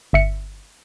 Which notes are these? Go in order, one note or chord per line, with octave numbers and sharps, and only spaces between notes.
G1 E5 C#7